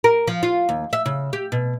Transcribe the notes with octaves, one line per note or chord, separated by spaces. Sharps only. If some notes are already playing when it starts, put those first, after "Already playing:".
A#4
F3
F4
D#2
E5
C#3
G4
B2